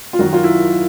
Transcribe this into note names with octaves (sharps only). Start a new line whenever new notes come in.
F4
F#2 D#3 F#3 F#4
F4
E4